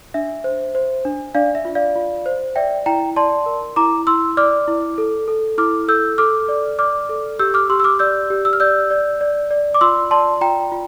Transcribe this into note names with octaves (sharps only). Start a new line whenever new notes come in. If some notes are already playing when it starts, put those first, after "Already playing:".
D4 E5
C5
C5
D4
D4 D5 F5
E5
F4
D5 F5
F4
C5
D5 E5 G5
E4 G5 A#5
D5 A5 C6
A#4
E4 A#5 D6
E4 C6 E6
D5 D6 F6
E4
A4
A4
E4 D6 F6
A4 E6 G6
A4 D6 F6
D5
D5 D6 F6
A4
G4 E6 G6
D6 F6
G4 C6 E6
E6
D6 F6
D5 E6 G6
G4
E6
F6
D5 E6 G6
D5
D5
D5
D6
F4 C6 E6
D5 A5 C6
F4 G5 A#5
F4